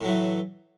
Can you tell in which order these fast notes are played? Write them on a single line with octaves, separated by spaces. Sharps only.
A2 F#3 E3